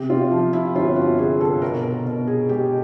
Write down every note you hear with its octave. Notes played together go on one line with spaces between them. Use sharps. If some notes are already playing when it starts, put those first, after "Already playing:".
Already playing: C3 G4
F4
F3
E4
G1 F4
F#4
G1 G#4
A4
B2 A#4
A#4
B2
G#4
G#3 G4